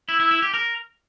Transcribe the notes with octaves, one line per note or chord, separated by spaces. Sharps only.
E4
E4
E4
G4
A#4